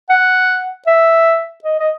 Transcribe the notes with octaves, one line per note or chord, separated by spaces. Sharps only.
F#5
E5
D#5
D#5